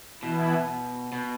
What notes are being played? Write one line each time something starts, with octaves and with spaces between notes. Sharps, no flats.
B2 E3 B3 E4
B2